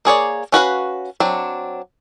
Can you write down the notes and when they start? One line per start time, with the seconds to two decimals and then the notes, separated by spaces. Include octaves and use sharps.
0.05 A#3 G#4 C#5 D5
0.52 C#4 F#4 B4 F5
1.20 F#3 C4 D4